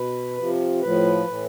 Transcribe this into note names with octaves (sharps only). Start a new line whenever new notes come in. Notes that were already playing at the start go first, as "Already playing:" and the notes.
Already playing: B2 B4
C3 F3
A2 F3 B4
A2 E3